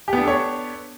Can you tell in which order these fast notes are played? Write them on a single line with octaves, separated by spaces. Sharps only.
G4 B3 D4 A4 C#5